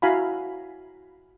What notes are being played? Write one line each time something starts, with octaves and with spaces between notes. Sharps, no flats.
E4 F#4 F5 G#5 A#5 B5